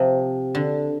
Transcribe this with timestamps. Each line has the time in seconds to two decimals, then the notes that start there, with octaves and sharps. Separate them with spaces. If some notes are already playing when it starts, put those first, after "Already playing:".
Already playing: C3 F3
0.55 D3